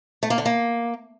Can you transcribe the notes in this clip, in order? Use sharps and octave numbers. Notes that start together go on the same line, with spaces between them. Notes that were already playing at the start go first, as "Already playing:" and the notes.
A3
A#3
D3
A#3